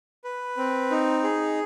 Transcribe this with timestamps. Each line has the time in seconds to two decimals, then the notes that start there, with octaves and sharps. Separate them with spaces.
0.24 B4
0.57 C4
0.91 D#4
1.23 G#4